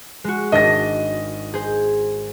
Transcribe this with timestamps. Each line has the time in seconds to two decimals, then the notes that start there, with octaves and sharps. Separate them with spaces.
0.24 G#3 F#4
0.52 G#1 D4 D#5 A#6
1.54 G#4 C5